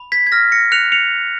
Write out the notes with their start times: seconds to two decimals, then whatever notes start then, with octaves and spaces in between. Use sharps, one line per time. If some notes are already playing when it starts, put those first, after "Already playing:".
Already playing: B5
0.12 G#6 B6
0.27 G#6
0.32 F6 A#6
0.52 A#6 C#7
0.72 F#6 C#7 F7
0.92 C#7 F7